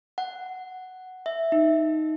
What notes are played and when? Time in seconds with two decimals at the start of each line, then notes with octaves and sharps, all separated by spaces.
0.18 F#5
1.26 E5
1.52 D#4